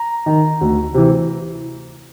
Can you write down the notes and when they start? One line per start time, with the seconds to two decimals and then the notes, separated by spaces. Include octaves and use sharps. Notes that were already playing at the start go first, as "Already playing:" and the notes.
Already playing: A#5
0.26 D#3
0.61 D2
0.94 C3 E3